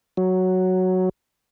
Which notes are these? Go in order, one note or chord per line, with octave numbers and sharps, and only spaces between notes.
F#3